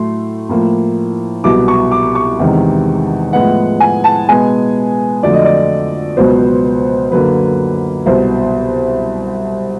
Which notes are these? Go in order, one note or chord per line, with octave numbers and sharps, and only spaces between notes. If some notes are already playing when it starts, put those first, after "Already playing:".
Already playing: A2 F#3 A3 C6
A2 F3 A#3
C2 B2 F#3 D6
C#6
D6
C#6
E2 C3 D#3 G#3
A2 F3 G#3 B3 F#5
G#5
A5
B2 G#3 B3 G#5
F2 D3 F#3 A3 D5
D#5
D5
C#2 B2 F#3 B3 C5
F#2 D3 F#3 A#3 B4
C2 B2 F#3 C5